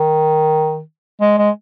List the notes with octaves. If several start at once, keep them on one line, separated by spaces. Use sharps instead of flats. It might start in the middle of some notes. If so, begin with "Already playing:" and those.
Already playing: D#3
G#3
G#3